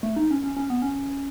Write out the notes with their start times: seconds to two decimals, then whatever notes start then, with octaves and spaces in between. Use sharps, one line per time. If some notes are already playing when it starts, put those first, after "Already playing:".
0.03 A3
0.16 D#4
0.31 C#4
0.44 C#4
0.57 C#4
0.70 B3
0.82 C#4